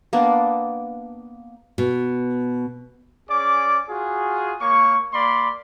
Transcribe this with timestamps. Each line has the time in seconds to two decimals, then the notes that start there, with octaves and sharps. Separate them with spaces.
0.13 A#3 B3 D4
1.78 B2
3.29 C#4 G#4 D5 D6
3.88 F4 F#4 G#4
4.60 A#3 C#5 C#6
5.12 A#3 D5 B5 C6